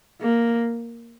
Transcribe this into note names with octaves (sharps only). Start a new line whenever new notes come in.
A#3